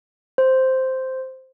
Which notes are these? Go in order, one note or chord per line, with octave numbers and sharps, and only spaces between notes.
C5